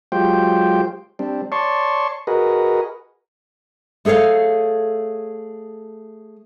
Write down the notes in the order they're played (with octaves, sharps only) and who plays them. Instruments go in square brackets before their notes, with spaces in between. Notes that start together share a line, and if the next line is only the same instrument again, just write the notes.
[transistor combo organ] F#3 G#3 F4 G4 C5 G5
G3 C4 D4
C#5 D5 A5 C6 C#6
F#4 G#4 A#4 B4 D#5
[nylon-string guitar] A3 G#4 A4 C#5 F5